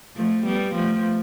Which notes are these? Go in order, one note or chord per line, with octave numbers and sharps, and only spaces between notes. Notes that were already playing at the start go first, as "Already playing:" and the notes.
F3 A3
G3 B3
F3 A3